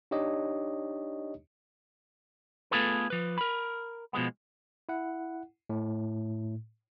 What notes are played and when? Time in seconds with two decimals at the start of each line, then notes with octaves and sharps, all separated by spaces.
0.11 D4 D#4 G4 C#5 D#5
2.71 A3 B3 F4 G#4 A4 B4
3.10 F3 B4
3.38 A#4 B5
4.13 B2 F3 G#3 B3
4.89 E4 F#5
5.69 A2